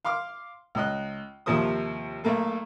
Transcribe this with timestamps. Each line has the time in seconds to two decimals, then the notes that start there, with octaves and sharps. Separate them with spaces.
0.05 F5 C6 D6 F6
0.75 C#2 D#5 F#6
1.46 D#2 C3 F3 A#3 C5 D#6
2.24 B1 A3 A#3 A4